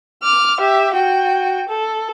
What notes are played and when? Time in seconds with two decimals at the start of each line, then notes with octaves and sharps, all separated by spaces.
0.22 D6 F6
0.60 G4 E5
0.94 F#4 G5
1.69 A4